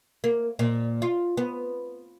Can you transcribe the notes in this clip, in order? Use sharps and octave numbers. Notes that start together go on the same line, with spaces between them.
A#3
A#2
F4
B3